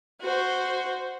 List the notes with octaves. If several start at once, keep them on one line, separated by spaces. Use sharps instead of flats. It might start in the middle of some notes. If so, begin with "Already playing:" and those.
F#4 C5